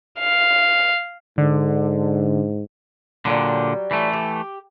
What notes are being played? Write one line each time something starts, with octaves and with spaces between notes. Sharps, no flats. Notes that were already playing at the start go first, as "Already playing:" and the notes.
F5
G#2 D3
A#2 D3 F#3 G3
E3 A3
G4